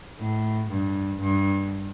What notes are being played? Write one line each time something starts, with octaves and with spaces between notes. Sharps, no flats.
A2
G2
G2